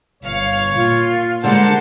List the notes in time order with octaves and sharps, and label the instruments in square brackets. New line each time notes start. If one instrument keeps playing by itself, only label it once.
[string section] G1 F5 C#7 [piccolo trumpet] C#5
[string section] A#2 [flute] F4
[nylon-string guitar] D3 G3 G#3 [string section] A#4 A5 A6 [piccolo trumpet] C5 [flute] F#5